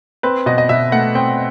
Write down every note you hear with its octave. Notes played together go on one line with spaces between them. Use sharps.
C4 B4
B2 D#5
D#5
B2 E5
A3 F#5
C4 G5